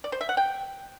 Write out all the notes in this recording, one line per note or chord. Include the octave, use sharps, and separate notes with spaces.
D5
C5
E5
F#5
G5